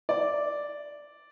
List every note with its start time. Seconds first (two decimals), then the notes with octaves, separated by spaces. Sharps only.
0.09 D5